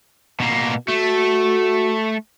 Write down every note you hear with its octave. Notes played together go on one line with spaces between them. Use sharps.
B2 A#3
A3 F#4